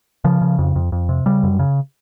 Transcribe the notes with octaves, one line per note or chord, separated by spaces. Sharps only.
C#3 F3
C#3
F2
F2
F2
C3
C#3 G3
F#2
C#3